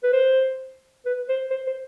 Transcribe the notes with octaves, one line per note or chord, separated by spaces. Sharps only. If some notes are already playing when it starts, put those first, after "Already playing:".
B4
C5
B4
C5
C5
C5